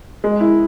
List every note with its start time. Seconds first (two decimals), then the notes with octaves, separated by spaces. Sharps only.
0.24 G#3
0.40 E4